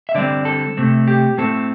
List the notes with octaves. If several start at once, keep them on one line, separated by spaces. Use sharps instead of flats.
E5
D3 G3 C4 D5
A4
C3 A3 C4
G4
A2 A3 C4 A4